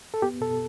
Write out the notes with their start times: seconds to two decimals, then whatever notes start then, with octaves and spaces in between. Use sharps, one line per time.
0.14 A4
0.22 B3 G4
0.41 B2 A4